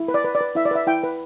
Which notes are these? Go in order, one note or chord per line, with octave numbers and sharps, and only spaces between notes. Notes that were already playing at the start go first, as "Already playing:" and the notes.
Already playing: E4
B4
D5
B4
D5
B4
E4 E5
D5
B4 E5
E4 G5
B4